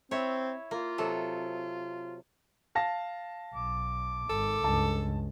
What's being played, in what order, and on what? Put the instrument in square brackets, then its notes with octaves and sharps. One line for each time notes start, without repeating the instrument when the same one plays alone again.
[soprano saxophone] C4 [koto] E4 C#5
[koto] A#3 [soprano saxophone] F4
[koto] C3 F#3 A4
[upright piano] F5 A5 A#6
[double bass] B1 [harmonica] D6
[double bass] G#1 [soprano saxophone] A4
[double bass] C#2 G2 [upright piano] A5